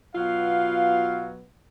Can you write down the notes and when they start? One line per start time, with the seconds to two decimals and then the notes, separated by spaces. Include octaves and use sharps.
0.15 B2 F#3 B3 F4 F5